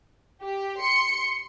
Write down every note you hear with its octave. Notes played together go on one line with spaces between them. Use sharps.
G4
C6 C#7